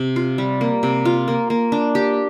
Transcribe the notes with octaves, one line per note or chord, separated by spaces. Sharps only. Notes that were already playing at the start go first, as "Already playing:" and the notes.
Already playing: C3
F4
G3
A#3
C3
F4
A#3
A#3
D4
G4